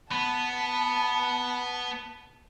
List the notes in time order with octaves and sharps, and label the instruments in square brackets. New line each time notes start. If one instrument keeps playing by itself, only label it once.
[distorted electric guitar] B3 [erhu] A5 [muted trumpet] B5